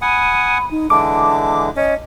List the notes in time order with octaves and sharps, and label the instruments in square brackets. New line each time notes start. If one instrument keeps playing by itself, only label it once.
[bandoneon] F#5 G#5 D#6 [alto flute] B5
[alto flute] D#4
[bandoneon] D3 E3 G#3 [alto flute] A5 [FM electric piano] D6
[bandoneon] C#4 [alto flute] D#5